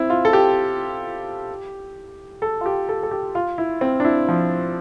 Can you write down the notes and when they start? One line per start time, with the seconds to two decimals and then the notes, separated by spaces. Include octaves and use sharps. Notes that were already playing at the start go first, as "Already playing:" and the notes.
Already playing: C4 E4
0.10 F4
0.25 A4
0.33 G4
2.42 A4
2.61 F4
2.66 G4
2.89 A4
3.03 A4
3.11 G4
3.35 F4
3.58 E4
3.81 C4
4.00 D4
4.05 E4
4.28 F3